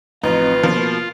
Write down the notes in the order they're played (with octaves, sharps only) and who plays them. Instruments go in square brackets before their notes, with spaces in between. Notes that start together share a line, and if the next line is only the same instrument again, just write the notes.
[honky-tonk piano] A1 [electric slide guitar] F2 D#4 [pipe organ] F4 [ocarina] B4
[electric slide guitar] B2 A#3 [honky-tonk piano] F3